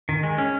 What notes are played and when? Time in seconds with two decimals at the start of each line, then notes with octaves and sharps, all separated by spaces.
0.09 D#3
0.23 G#3
0.38 C#4